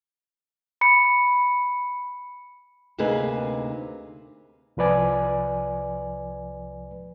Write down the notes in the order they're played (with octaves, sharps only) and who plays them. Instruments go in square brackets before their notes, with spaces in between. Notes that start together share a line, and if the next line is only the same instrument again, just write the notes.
[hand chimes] B5 C#7
[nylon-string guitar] D2 C3 A#3 D#4 G#4 B4
[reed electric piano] C2 F3 B4 D5 G#5